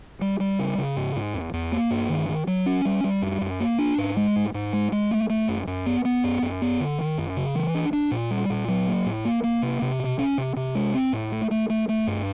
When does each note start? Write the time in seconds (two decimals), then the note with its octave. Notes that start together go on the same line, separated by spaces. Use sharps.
0.21 G3
0.40 G3
0.59 C#3
0.78 C#3
0.96 G#2
1.16 G#2
1.34 E2
1.53 E2
1.72 A#3
1.90 G2
2.09 D#3
2.29 D#3
2.47 F#3
2.66 C#4
2.85 G3
3.04 G3
3.22 F#2
3.41 F#2
3.60 A#3
3.79 D4
3.98 G#2
4.17 G#3
4.36 G#2
4.54 G#2
4.73 G#3
4.92 G#3
5.11 A3
5.30 A3
5.48 F#2
5.67 F#2
5.86 B3
6.05 B3
6.24 F#2
6.43 F#2
6.62 B3
6.80 D3
6.99 D#3
7.18 F#2
7.37 C#3
7.55 E3
7.75 D4
7.93 D4
8.11 A#2
8.30 G3
8.50 A#2
8.68 F#3
8.88 A#3
9.06 A2
9.25 A#3
9.44 A#3
9.62 C3
9.82 C3
10.00 B2
10.19 C#4
10.38 C3
10.56 C3
10.75 G#3
10.94 C4
11.13 A2
11.32 A3
11.51 A3
11.70 A3
11.89 A3
12.07 G2